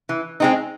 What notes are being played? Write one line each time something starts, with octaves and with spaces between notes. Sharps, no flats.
E3
G#3 C4 D#4